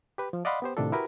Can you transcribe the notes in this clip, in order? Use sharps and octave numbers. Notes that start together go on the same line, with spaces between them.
G4 B4
F3
D5 D#5 F5 F#5 B5 C6
B3 G4 C5
A2 C3 D#3 D4 F4 A4
E4 F#4 G4 A#4 B4